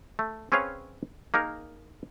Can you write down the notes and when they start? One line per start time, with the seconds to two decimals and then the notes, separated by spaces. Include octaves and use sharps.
0.19 A3
0.52 C4 C#4 G#4 B4 C#5 F5
1.34 A#3 D#4 G#4 A#4